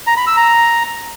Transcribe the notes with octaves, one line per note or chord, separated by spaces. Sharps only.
A#5
B5
E6
A#5